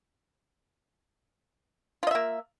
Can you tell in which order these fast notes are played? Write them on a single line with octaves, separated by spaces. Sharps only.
F4 D#5 E5 A#3